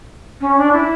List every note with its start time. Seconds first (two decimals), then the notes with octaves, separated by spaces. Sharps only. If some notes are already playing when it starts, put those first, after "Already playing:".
0.41 C#4
0.58 D4
0.73 E4